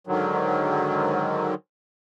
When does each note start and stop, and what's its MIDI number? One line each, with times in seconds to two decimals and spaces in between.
0.07 1.54 44
0.07 1.54 50
0.07 1.54 51
0.07 1.54 54